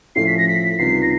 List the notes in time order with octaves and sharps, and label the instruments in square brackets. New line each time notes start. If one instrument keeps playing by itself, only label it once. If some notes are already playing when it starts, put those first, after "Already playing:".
[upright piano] A2 F3 A3 C#4 E4 [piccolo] C7
[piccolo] B6
A#6
B6
[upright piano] C#2 C3 D#3 G3 [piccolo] C7
[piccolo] A#6